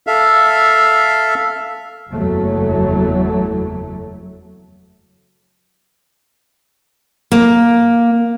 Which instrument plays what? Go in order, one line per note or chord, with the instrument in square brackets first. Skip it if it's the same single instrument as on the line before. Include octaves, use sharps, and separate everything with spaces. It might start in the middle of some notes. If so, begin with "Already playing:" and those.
[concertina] A4 E5 F5
[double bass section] F#1 E2 F#3 A3
[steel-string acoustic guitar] A#3